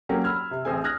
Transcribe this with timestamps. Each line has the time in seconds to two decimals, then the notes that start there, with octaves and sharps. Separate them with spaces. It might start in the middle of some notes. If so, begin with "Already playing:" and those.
0.09 F#3 A#3 C#4 G4
0.24 B5 E6 F6 G#6
0.51 C3
0.65 A1 C4 G#4 G#5
0.84 D#6 F6 F#6 G#6 A#6